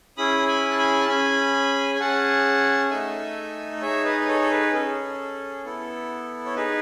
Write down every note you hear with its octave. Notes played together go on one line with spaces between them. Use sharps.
C#4 E4 G#4 B5 D#6
G#5 B5
A5
G#5 B5
A5
C#4 G#4 G#5 B5
G#5
C#4 G#4 F#5 A5
A3 D#4 A4 E5 G#5
D#4 G#4 C#5 E5
B4 D#5
D#5
A4 C#5
A4
B4
C#4 G#4 A4
B3 E4 A4
C#5
D#4 G#4 B4